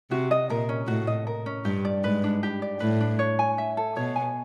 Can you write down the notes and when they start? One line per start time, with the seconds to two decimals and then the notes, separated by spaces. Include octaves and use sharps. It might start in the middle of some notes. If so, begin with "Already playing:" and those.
0.11 C3 F#4
0.31 D#5
0.50 A#2 A#4
0.69 C#4
0.88 A2 F#4
1.07 D#5
1.27 A#4
1.46 C#4
1.65 G2 G4
1.85 D5
2.04 G#2 B4
2.24 D4
2.43 G4
2.62 D5
2.80 A2 B4
3.01 D4
3.19 C#5
3.39 G#5
3.58 E5
3.77 A4
3.97 B2 C#5
4.16 G#5